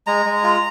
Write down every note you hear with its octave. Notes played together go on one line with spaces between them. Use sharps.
G#3 A#5
G#3
F4